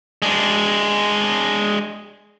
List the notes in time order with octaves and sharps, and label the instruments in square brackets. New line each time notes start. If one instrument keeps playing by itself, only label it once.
[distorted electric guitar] G#3 D4